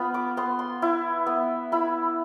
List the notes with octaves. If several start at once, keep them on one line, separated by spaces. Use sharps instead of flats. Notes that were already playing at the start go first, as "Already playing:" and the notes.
Already playing: B3 F4 B5
D6
B3 C6
C6
E4
B3
E4 B5